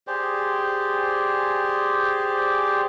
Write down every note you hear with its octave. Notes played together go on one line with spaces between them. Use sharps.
G4 G#4 C5 D5